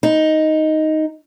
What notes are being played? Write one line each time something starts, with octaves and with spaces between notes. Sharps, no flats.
D#4